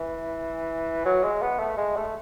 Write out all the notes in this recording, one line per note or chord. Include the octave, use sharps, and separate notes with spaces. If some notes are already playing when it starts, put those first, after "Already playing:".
Already playing: E3
F#3
G#3
B3
A3
G#3
A3